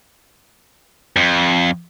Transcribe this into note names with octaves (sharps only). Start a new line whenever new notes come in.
F2